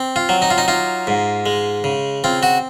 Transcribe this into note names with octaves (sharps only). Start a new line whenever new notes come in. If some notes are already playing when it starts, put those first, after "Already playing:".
Already playing: C4
F4
F#3
D#4
F4
D#4
D#4 F4
G#2
G#3
C#3
C4 F4
F#4